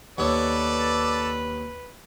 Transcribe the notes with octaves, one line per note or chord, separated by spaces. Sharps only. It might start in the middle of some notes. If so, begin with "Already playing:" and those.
D#2 B3 A4 B4 C#5 D5